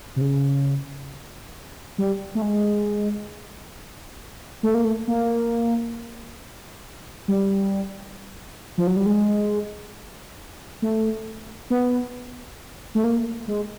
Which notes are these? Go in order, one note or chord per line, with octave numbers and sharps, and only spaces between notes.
C3
C#3
G3
A3
G#3
A3
A#3
A3
A#3
G3
F3
F#3
G3
G#3
A3
B3
A3
A#3
G#3